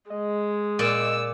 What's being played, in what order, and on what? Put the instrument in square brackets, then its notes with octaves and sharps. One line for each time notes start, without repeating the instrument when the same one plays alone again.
[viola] G#3 [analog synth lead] D#5
[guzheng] A#2 D5 [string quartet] E6